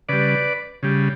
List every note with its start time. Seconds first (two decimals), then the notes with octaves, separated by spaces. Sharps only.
0.09 C#3 G3 B4 D5
0.83 C#3 G3